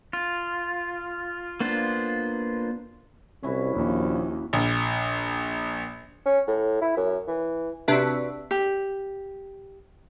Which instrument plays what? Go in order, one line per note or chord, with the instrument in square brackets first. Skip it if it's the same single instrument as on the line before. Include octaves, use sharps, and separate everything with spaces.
[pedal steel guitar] F4
A#3 B3 D4 F4 C5
[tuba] C2 [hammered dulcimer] C#4 E4 F#4
[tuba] A#1 [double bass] D#2
[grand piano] A#1
[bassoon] C#4
A2
E4
F#2
E3
[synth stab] C3 D4 E5 [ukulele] F#4 B4
[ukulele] G4